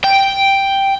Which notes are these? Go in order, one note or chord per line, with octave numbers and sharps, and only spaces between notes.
G5